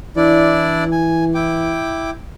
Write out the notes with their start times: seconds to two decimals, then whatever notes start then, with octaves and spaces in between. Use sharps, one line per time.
0.17 E3 D4 E4 D5
0.92 G#5
1.35 E4 G5 D6